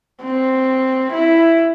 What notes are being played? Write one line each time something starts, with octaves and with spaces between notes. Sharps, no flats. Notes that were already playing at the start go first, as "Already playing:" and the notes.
C4
E4